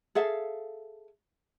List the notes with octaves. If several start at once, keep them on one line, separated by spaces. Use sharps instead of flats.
G#4 A4 E5 F5